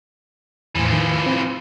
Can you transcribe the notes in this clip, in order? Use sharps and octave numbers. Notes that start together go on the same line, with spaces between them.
E2 A2 E3 F3
D#3
C4